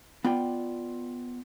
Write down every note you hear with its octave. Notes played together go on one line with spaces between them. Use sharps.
B3 F4 D5 G5